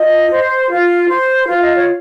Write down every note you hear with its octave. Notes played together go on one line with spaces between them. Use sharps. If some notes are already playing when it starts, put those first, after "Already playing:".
Already playing: F4 D#5
C5
F4
C5
F4 F5
D#5
C#5